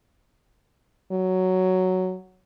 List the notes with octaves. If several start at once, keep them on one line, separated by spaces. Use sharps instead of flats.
F#3